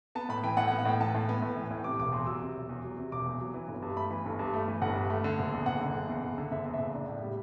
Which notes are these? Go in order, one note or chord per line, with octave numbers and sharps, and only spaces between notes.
B3 A5
A2 B5
E3 G5
A2 F#5
F#5
B3
F#5
A2 G5
E3 A5
A2
B3
A2
E3
A2
C3 D6
E1 D6
E2 C6
F#3 E6
C3
E1
E2
F#3
C3
E1 D6
E2
F#3
E3
G1
G2
A3 B5
E3
G1
G2
A3
E3
G1 F#5
G2
A3
D3
F#1
E2
F#1 F#5
D3
F#1
E2
F#1
D3
F#1 E5
E2
E5
F#1
D4
A2
G3